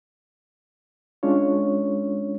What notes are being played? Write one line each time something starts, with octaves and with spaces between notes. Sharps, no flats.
G#3 C#4 D4 F4 C#5